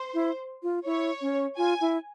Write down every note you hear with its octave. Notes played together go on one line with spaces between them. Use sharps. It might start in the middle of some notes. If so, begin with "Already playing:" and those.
Already playing: C5
E4
F4
E4 C#5
C#4
F4 G#5
E4